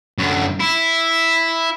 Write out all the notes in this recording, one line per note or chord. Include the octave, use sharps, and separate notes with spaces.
F#2 D3
E4